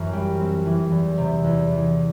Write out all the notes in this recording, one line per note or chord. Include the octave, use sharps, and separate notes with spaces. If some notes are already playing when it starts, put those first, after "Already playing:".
Already playing: F#2 E3 C4
G3
C4
E3
E2
C3
E2
E3